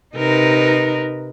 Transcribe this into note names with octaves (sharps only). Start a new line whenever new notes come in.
C3 D#4 A#4 B4